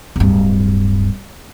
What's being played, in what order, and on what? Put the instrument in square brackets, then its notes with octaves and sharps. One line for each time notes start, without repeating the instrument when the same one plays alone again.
[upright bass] D1 G2